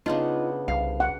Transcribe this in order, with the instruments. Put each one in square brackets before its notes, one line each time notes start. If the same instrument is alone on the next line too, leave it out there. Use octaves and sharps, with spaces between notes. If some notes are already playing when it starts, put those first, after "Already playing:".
[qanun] C#3 B3 D4 [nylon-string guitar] D#4 [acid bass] F4
[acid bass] C2 [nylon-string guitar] F5
[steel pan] F#5